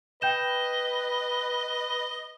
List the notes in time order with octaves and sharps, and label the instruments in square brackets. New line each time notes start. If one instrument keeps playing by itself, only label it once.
[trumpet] B4 [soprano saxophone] D#5 [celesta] G5 G6 E7